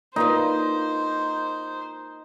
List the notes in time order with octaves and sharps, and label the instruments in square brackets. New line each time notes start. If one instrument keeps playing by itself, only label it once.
[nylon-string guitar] A#3 F4 B4 [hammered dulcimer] D#4 [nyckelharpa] C5